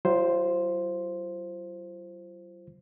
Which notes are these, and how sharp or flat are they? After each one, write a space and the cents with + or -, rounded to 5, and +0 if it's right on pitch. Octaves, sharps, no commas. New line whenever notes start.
F#3 +35 F4 -30 C5 +0